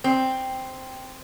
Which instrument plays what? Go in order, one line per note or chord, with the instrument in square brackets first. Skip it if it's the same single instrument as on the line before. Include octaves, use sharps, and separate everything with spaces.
[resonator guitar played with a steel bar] C4